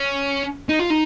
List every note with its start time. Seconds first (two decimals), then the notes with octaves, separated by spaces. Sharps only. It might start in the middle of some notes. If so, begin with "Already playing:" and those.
Already playing: C#4
0.69 D#4
0.79 F4
0.90 D#4